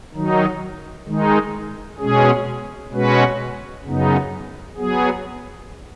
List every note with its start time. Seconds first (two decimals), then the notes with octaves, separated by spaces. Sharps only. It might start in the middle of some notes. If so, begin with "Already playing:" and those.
0.13 D#3 F#3 D#4
1.06 D#3 G#3 D#4
1.98 B2 G#3 C#4 G#4
2.91 B2 G#3 C#4 F#4 B4
3.85 F#2 C#3 B3 D#4
4.77 F#3 B3 G#4